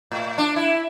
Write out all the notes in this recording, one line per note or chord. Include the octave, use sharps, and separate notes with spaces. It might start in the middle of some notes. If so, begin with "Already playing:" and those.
A2
D4
E4